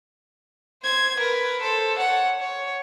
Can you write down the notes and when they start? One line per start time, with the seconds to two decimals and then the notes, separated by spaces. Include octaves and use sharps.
0.82 C5 G#6
1.17 A#4 B4
1.62 A4 C5
1.97 C#5 F#5
2.38 C#5